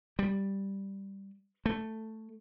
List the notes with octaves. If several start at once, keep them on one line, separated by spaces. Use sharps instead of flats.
G3
A3